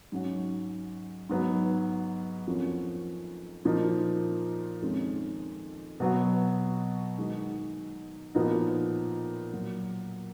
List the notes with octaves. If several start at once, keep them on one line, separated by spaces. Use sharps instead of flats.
G#2 F#3 C#4 F#4
G#2 F#3 B3
F2 F3 A#3 C#4
A#2 F3 A#3 D#4
F2 D#3 G#3 C#4
B2 F#3 B3 F#4
D#3 G#3 D#4 F#4
A#2 F3 B3 D#4
A#2 F#3 A#3